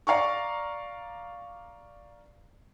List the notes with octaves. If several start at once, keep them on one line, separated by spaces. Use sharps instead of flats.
D5 F5 A#5 C#6